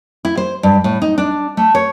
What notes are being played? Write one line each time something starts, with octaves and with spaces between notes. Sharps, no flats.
E4
C5
G2
A2
D#4
D4
A3
C#5